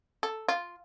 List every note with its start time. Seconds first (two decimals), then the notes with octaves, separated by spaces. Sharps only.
0.23 A4
0.48 F4